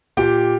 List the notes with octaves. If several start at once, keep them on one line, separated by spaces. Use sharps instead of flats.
A#2 G4 G5